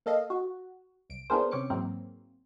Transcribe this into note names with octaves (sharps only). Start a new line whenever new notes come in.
A#3 A4 D#5 F5
F#4
C2 D7
B3 D4 E4 G#4 A#4 C5
C3 C4 C#4 D6 C#7
G#2 E3 F#3 A#3 C4